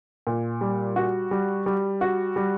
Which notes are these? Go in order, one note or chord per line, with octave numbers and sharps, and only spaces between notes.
A#2
G3
F#4
G3
G3
F#4
G3